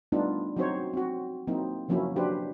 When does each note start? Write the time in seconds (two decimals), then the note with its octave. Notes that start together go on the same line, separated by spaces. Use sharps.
0.12 G3 A3 B3 D4 D#4 F4
0.56 F#3 C4 D#4 F#4 C5 C#5
0.94 C4 F#4
1.47 F#3 A#3 C4 D#4 E4
1.88 C#3 F3 F#3 A#3 C#4 E4
2.16 F#3 D4 G4 B4 C5